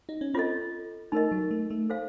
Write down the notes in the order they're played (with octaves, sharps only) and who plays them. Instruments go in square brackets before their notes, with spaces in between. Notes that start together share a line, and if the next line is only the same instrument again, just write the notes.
[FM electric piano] D#4
C#4
[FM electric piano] C4 [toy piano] F4 A4 D#5
[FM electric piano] A3 [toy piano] D#4 A#4 D#5
[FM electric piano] F#3
A3
A3
[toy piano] A4 C5 F5